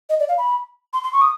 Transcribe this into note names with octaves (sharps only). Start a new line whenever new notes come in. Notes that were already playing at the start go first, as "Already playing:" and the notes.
D#5
D5
F5
B5
C6
C6
C#6
D#6